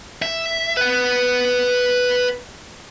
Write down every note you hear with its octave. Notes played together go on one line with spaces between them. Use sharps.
E5
B4 F#5